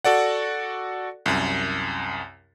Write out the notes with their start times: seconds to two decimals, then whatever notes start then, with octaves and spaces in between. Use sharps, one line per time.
0.04 F#4 A4 D5 F#5
1.26 C2 F#2